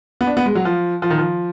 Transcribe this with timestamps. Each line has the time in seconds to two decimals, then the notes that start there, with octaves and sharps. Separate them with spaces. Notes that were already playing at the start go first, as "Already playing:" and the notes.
0.21 B3
0.27 D4
0.37 B3
0.46 G#3
0.55 F#3
0.65 F3
1.02 F3
1.10 D#3
1.18 F3